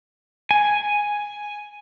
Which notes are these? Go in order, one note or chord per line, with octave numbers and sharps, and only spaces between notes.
G#5